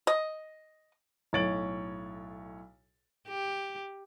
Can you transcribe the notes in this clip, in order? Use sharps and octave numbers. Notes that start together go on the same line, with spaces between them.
D#5
B1 A2 C#5 A6 D7 F#7
G4